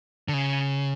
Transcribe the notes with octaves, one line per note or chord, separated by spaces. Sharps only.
D3
C#3